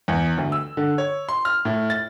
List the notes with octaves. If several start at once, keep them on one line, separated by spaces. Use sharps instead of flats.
E2
D2
E6
D3
C#5
C6
F6
A2
A6